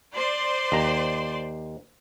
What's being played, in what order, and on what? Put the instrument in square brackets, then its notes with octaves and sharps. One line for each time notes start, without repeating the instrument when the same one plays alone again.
[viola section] C5 D5 C6
[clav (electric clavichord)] D#2 A#5